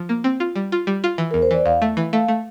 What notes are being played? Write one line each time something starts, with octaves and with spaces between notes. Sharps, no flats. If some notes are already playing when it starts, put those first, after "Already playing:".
Already playing: F3
A#3
C4
F4
G3
F4
G3
F4
E3
A#4
E2
C5
E3 D5
E2 F5
A3
E3
A3 F5
A3